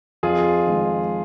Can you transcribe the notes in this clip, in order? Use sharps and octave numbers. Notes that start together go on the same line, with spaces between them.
F2 F4 G#4
D#3 G#3